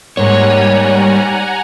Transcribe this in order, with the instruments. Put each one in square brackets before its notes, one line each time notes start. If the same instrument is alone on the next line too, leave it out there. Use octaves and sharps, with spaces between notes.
[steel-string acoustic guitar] G#2 A#3 [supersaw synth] G3 [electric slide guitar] C#5 [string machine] F#5 G#5 A#5